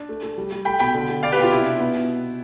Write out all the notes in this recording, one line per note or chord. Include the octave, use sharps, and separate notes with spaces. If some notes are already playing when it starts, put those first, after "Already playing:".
Already playing: D4
A3
A3
G3
G3
A3 G5 B5
B2 G5 B5
D3
D3
D4 D5 F5
G4 B4
B2 F4
C3 E4
D4
B3
B2